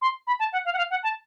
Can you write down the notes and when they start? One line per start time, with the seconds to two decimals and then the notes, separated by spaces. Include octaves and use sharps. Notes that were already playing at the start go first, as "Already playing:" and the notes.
0.02 C6
0.27 B5
0.39 A5
0.53 F#5
0.65 F5
0.74 F#5
0.78 F5
0.90 F#5
1.03 A5